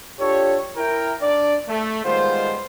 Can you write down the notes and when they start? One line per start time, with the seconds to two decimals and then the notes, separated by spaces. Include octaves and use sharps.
0.20 D4 F4 G4 A4 C#5
0.77 E4 A#4 G5
1.22 D4 D5
1.68 A3
2.05 D#3 G3 G#3 B3 F4 C5